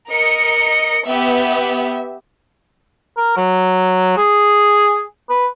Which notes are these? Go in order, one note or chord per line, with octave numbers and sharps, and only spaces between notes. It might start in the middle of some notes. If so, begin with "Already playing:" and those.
A#4 D#5 C#7
B3 G4 E5
A#4
F#3
G#4
B4